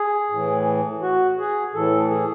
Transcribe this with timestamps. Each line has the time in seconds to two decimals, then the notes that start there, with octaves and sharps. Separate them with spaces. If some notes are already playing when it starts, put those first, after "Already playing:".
Already playing: G#4
0.30 A2 E3
1.02 F#4
1.38 G#4
1.74 A2 E3 A4
2.10 G#4